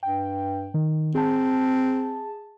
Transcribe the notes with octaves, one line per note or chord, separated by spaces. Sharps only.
G2 G5
D#3
C4 G#4 A5